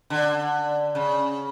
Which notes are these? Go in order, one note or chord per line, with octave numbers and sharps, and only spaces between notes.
D3
C#3